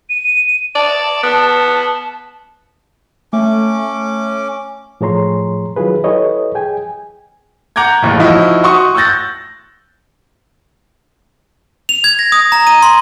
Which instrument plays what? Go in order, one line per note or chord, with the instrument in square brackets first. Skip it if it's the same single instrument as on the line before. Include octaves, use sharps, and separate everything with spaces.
[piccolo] D#7
[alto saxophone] D5 [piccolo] A5
[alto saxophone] B3
[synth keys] A3 [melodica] C#4 D6
[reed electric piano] A2 F3 G#4 C#5 A#5 C6
D#3 F#3 E4 F4 G#4 B4
E4 G4 A4 B4 C#5 D#5
G#4 G5 G#5
[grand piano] F#5 A#5 D6 G6 G#6
F#1 D#2 A2
F3 D#4 E4 F#4
F#4 C6 C#6 D#6
C#6 E6 F#6 G6 A6 A#6
[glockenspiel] F7
G#6
A#6
D#6
A#5
D#7
C6